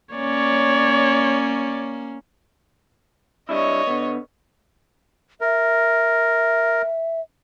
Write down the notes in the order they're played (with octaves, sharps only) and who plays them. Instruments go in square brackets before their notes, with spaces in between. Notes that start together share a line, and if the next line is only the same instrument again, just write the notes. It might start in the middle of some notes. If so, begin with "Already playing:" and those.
[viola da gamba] A#3 C#4 [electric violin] C#5 D5
[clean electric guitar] G3 D4 E4 [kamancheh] C#5 D#5
[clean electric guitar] D3 B3
[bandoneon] A#4 [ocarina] E5